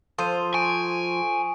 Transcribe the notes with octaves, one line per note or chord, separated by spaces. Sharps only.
F3 F4 A4 C5 D#6 D#7
G#5 C#6 D7